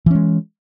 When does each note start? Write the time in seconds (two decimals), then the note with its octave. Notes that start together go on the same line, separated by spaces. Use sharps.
0.06 E3
0.11 C#4
0.15 G#3